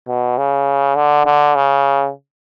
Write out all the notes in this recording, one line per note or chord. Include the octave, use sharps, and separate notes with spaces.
B2
C#3
D3
D3
C#3